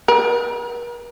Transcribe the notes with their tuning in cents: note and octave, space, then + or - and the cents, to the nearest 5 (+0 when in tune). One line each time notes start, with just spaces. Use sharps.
A#4 +45